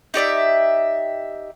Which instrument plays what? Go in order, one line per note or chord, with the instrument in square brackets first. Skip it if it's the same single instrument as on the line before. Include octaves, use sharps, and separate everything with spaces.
[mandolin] D#4 G4 D5 E5